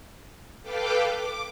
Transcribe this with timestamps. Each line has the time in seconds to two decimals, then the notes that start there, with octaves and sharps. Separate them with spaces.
0.62 A4 B4 F5 G5 D6
1.12 D6